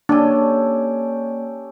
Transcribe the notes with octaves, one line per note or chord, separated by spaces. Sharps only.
A#3 C#4 D4 G4 A4 D5